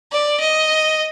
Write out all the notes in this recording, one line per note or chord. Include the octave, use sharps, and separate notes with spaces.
D5
D#5